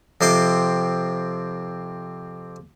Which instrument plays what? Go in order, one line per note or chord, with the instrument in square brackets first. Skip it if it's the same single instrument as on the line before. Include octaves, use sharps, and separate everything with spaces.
[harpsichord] F2 C3 C6 D6